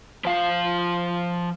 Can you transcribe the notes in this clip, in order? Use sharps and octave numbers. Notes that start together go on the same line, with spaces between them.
F3 F5